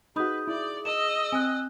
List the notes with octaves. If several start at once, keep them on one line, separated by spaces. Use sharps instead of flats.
D#4 F#4 G#4 B4 B5 D#6 G6
E4 D5
D#5 E6 E7
C4 G#5 F#6